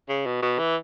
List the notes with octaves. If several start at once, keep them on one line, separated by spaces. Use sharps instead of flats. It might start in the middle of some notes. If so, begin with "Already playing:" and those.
C#3
B2
B2
E3